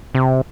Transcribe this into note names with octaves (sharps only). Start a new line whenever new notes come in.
C3